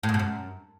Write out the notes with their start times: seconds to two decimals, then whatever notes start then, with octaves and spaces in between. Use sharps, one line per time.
0.03 A2
0.09 G#2
0.14 B2
0.19 F#2